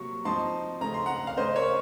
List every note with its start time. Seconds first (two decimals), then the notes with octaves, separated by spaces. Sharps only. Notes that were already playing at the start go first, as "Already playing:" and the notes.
Already playing: C3 F#3 A#3 C#6
0.25 F3 C4 D#4 A5 C6
0.81 C#3 A3 C4 D#4 A#5
0.94 C6
1.06 F#5 A#5
1.27 F5
1.37 C#3 A3 C#4 C5 D#5
1.56 A#4 C#5